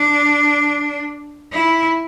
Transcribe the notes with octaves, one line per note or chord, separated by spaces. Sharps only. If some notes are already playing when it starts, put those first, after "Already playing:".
Already playing: D4
E4